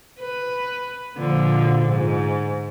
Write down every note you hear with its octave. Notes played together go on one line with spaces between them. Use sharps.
B4
A#2 D3 F3
G#2